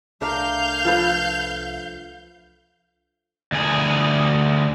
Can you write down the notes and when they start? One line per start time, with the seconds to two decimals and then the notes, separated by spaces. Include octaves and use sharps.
0.21 C2 A3 D4 A#4 F5 G6
0.85 F3 A4 B4
3.52 D2 G#4